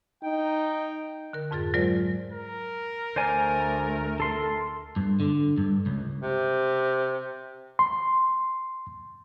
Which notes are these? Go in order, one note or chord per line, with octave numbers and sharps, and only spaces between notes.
D#4 G5
D3 A#4
F2 G#2 F4 G#4 A6
F#3 G#3 F4 A#4 C5 D5
A#4
D2 A3 C5 D5 G#5
A4 C6
G2
D3
G2
C#2
C3
C6